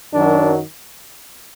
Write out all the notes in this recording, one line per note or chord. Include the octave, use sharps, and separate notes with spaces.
F#2 D#3 F#3 D4